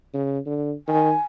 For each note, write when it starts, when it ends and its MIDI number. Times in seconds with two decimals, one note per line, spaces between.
0.14 0.39 49
0.46 0.73 50
0.88 1.13 51
0.88 1.21 80